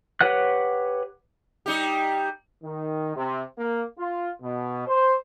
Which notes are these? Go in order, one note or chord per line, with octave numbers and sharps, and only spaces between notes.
G4 B4 C#5 F#5 F#6
G3 D#4 G4
D#3
C3
A#3
F4
B2
C5